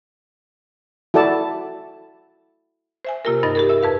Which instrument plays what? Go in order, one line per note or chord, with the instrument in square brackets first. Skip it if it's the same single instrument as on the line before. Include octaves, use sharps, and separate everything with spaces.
[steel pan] E4 F#4 A4 D5 A5
[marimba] C5 E5 G#5
C3 A#3 F4 G4 A#4
G2 D#4 D#5 A6
G4 G#4 A#4
A#4 E5 E6
F2 B4 F5